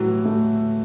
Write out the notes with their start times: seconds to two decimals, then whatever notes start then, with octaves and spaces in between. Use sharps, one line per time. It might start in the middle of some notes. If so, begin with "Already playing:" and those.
Already playing: A2 E3 F#3 G3
0.25 A3